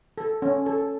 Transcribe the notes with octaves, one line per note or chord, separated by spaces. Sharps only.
A4
C#4
A4